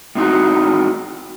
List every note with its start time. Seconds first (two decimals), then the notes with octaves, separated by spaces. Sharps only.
0.15 A2 C4 D#4 F#4